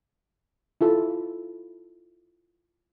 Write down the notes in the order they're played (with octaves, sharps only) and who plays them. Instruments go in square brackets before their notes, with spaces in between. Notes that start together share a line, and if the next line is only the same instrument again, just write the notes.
[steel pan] E4 F4 A4